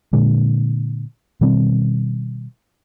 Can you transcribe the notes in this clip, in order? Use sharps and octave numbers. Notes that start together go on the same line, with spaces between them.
A#2 D3 G#3
B2 D#3 G3 C4